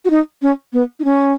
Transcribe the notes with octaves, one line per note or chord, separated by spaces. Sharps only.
F#4
D#4
C#4
B3
D#4
C#4